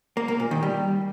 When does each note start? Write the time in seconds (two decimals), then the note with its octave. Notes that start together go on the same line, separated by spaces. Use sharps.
0.17 A#3
0.28 A#3
0.40 A#2
0.51 D#3
0.63 G3